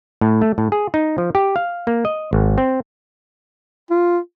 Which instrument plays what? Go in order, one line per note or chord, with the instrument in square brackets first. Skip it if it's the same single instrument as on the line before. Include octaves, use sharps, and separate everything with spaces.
[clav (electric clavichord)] A2
A3
A2
G#4
D#4
F3
G4
F5
A#3
D#5
G#1
C4
[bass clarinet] F4